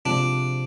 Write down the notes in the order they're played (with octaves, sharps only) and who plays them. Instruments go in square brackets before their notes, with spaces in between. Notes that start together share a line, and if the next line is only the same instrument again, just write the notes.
[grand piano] C3 F3 G#3 C4 [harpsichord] D4